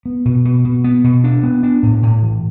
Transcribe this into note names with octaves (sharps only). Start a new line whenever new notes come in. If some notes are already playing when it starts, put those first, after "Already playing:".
B3
B2
B2
B2
B3
B2
D4
B3
D4
A2
A2
E3